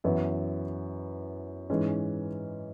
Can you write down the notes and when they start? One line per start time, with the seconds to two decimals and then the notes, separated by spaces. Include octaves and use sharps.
0.04 F#2 E3 B3 E4
1.70 G#2 E3 G#3 C#4